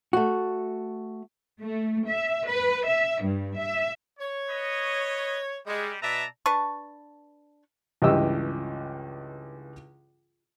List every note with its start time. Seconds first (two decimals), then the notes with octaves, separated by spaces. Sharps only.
0.13 A3 F#4
1.61 A3
2.07 E5
2.48 B4
2.85 E5
3.22 G2
3.57 E5
4.19 C#5
4.50 B4 D#5
5.67 G3 G#3
6.02 B2 B4 D5 E5 A5 A#5
6.46 D4 B4 A5 C#6
8.02 C#2 G2 E3 G4 D#5 E6